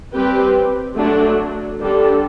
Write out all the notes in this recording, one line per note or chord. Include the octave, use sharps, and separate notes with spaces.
G3 C4 G4 B4
D3 F#3 A3 D4 F#4
D3 G3 D4 A4